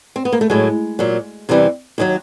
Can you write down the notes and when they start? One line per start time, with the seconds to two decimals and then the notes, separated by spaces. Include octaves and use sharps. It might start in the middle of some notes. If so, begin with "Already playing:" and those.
0.16 C4
0.25 B3
0.33 A#3
0.41 A3
0.50 A2 F#3 G#3
0.99 A#2 F#3
1.49 E2 C3 E3 G3
1.98 D#2 D#3 F#3